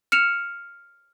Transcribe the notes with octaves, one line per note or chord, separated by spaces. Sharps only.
F6 C#7 E7 F7